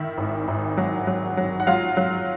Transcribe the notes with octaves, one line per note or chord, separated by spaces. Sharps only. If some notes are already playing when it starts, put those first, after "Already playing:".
Already playing: D#3 E4 E5
G#1
G#1
F#3
F#3
F#3
F#5
F#3 F4 F5
F#3